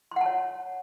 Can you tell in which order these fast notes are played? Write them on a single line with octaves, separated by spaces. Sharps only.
C6 F#5 A5 C#5